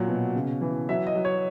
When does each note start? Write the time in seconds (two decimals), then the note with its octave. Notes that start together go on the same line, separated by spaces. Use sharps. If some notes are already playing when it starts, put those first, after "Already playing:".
Already playing: A#2 F#3
0.08 B2
0.35 C#3
0.61 E3
0.89 F#3 E5
1.07 D#5
1.15 F#3
1.25 C#5